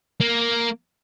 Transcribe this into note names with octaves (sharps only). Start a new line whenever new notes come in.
A#3